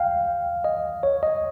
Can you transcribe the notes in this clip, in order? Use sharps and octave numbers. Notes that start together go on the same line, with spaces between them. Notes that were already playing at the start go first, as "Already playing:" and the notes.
Already playing: F5 G5
D#5
C#5
D#5